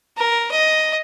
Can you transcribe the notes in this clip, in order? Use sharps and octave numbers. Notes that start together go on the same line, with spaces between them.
A#4
D#5